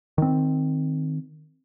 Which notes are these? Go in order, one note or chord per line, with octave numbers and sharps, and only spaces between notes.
D#3 C4